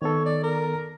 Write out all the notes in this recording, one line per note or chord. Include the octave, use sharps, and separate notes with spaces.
D#3 B3 A4 C#5
D5
A#4